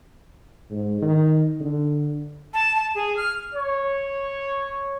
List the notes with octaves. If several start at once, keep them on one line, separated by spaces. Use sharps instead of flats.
G#2
D#3
D3
A5
A5
G#4
F6
C#5